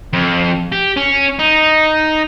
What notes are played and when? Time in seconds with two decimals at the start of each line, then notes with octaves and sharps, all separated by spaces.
0.14 F2
0.72 G4
0.97 C#4
1.39 D#4